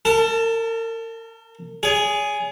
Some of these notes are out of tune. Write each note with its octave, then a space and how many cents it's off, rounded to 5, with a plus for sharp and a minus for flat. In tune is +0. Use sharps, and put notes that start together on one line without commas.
A#4 -40 A5 +5
G#4 +0 C#5 +45